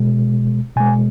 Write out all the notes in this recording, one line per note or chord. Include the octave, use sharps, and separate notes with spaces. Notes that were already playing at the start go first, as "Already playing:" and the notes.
Already playing: B2 G#3
B2 G#3 G#5